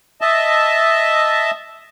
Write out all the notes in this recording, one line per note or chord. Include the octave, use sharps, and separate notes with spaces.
D#5 E5 A5